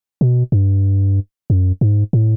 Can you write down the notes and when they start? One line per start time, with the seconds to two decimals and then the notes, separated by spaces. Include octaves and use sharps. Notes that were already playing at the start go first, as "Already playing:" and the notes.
0.21 B2
0.52 G2
1.50 F#2
1.81 G#2
2.13 A2